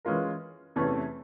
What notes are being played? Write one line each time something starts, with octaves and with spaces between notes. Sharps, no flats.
E3 G#3 C#4 F4 A#4
E2 C3 E3 A3 C#4